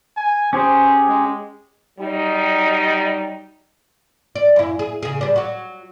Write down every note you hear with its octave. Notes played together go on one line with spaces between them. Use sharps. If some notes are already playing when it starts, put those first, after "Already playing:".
G#5
C#4 G4 G#4 C5
G#3
F#3 G3 D#4
D5
F#2 E4
G#4
C#3 G#4
G3 D4
F#3 F#4